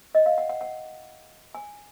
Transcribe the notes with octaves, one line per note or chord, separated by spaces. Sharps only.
D#5
F5
F#5
F#5
F#5
G#5